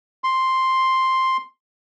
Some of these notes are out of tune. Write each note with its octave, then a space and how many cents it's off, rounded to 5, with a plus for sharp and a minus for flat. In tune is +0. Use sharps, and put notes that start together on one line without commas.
C6 +5